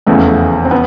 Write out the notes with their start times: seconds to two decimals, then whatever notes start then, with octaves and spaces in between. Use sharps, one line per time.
0.06 F1 E2 C#3 A3 B3
0.65 C4
0.71 B3